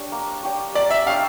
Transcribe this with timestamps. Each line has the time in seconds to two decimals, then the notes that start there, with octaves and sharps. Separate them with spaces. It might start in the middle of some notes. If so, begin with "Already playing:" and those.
Already playing: D4 G4 C#5
0.12 A#3
0.43 D4 G4 C#5
0.74 A#3 D5
0.91 E5
1.06 D4 G4 C#5 F5